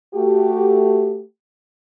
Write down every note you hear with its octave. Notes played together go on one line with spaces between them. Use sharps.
A3 F#4 G4